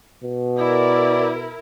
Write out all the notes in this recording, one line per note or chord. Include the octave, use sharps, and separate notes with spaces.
B2
E4 A#4 D5